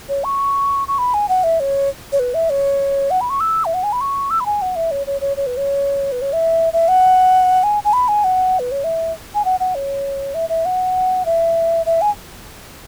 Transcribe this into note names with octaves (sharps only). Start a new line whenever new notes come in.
C#5
C#6
C#6
B5
G#5
F#5
E5
C#5
C#5
B4
E5
C#5
F#5
B5
C#6
E6
E5
F#5
G#5
B5
C#6
E6
B5
G#5
F#5
E5
C#5
C#5
C#5
C#5
B4
C#5
B4
C#5
E5
E5
F#5
G#5
G#5
B5
G#5
F#5
B4
C#5
E5
G#5
F#5
F#5
C#5
E5
E5
F#5
E5
E5
G#5